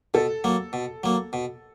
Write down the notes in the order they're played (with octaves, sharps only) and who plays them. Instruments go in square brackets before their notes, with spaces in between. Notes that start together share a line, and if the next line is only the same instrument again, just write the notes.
[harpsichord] B2 [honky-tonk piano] A4
[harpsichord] F#3 A#3
B2
F#3 A#3
B2